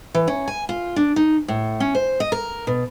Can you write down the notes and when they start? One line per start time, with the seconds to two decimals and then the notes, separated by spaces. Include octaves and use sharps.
0.14 E3
0.28 C#4
0.48 G#5
0.69 F4
0.96 D4
1.16 D#4
1.48 A2
1.80 C#4
1.95 C5
2.20 D#5
2.32 A#4
2.67 B2